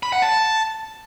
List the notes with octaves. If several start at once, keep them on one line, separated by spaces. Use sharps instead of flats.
B5
F#5
A5